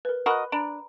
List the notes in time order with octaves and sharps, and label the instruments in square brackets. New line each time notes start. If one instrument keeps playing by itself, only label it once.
[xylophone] A#4 B4
[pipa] F#4 A#4 D#5 [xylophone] B5 F#6
[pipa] D4 [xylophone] A#5 B5 D7